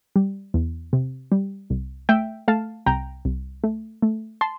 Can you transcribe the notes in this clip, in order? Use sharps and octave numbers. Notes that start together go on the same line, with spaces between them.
G3
E2
C3
G3
C2
A3 E5 G5
A3 F5 A5
C2 G5 A#5
C2
A3
A3
A5 C6